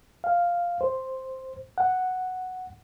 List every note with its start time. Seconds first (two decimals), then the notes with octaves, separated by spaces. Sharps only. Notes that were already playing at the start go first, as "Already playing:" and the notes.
0.24 F5
0.81 C5
1.78 F#5